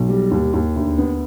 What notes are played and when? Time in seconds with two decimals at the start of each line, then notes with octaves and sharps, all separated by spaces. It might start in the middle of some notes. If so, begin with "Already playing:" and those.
Already playing: B1
0.09 G3
0.31 D#2
0.54 D#2
0.76 D2
0.98 B3